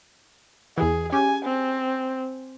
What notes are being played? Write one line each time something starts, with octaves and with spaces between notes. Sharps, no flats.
E2 E3 G#4
C#4 G4 G#5
C4